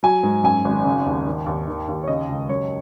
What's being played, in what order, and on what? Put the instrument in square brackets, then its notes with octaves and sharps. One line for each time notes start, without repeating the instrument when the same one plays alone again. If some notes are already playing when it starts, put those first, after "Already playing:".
[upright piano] F#3 G#5
G#2
F#2 G#5
G#1
C#3
D#2
D#3
D#2
D#3
D#2
C#5
C#3 D#5
C#2
F#2 C#5